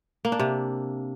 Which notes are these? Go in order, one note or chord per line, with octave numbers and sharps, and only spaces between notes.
A#3
D4
C3